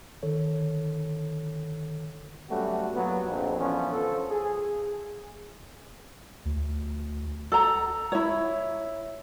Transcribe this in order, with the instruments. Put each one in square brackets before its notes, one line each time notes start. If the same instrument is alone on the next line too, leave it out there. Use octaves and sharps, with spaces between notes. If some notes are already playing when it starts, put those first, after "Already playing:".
[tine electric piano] D3 D#3 A4 C#5
[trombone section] F#3 G3 A3 B3 C#4 F#4
G2 A#2 F#3 A#3 B3
A#1 F2
D3 E3 F3 B3 C#4
F3 A4
G#4
[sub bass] D2
[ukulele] A4 A#5
E4 C#5